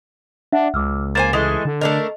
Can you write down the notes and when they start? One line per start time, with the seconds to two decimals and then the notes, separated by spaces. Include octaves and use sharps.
0.52 D4 E5 F#5
0.74 C#2 D6 E6 F6
1.15 A#3 C5 G#5 A6 E7
1.33 E3 G#3 A3
1.65 D3
1.81 A3 D4 A#4 D#5